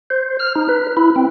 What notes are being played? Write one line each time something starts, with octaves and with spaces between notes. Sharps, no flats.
C5
F6
D#4
B4
E4
C4